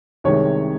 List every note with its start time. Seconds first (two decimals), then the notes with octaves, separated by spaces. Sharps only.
0.24 C2 C3 D#3 G#3 C#5